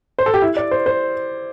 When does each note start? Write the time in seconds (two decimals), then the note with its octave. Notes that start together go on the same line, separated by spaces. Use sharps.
0.19 C5
0.26 A4
0.34 G4
0.42 E4
0.57 D5
0.71 C5
0.86 C5